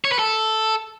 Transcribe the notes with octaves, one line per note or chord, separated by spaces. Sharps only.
C#5
B4
A4